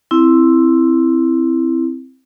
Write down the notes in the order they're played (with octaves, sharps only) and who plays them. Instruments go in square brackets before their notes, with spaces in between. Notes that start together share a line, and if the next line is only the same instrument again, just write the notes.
[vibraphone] C4 E4